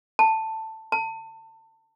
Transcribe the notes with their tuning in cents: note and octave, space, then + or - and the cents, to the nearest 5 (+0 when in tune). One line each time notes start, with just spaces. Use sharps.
A5 +10
A5 +30